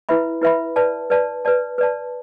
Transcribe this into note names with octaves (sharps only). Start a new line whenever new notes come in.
E4 B4 E5 B5
E4 B4 E5 B5
B4 D5 A5
B4 D5 A5
B4 D5 A5
B4 D5 A5